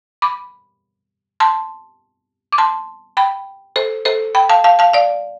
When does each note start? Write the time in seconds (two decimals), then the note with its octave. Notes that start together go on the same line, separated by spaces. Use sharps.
0.22 B5 D6
1.40 A5 C6
2.52 D6
2.58 A5 C6
3.17 G5 B5
3.76 A4 C5
4.05 A4 C5
4.35 G5 B5
4.49 F5 A5
4.64 F5 A5
4.79 F5 A5
4.93 D5 F5